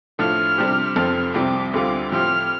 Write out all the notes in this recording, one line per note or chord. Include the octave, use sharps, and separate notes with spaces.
A2 F3 A3 D4 F4 F6
C3 G3 D4 G4 C5
F1 F2 F3 C4 A4 F6
C2 C3 G3 C4 D6
D2 D3 G3 C4 F4 D6
A2 F3 C4 G4 F6